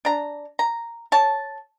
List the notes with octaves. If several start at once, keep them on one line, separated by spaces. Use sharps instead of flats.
D4 A#5
A#5
C#5 A5